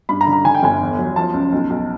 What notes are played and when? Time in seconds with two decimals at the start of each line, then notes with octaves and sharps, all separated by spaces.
0.09 G2 B5
0.21 A#5
0.27 D3
0.33 A#5
0.45 D3 G#5
0.54 G5
0.63 G1 G#5
0.80 E2
0.99 F#3
1.16 F3 A5
1.34 C#2
1.52 B1
1.70 B1